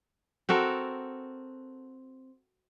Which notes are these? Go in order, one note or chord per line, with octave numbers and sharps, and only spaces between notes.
C4 F#4 A4 A#4